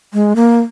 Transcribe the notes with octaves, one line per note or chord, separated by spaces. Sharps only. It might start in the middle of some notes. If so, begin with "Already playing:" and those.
G#3
A#3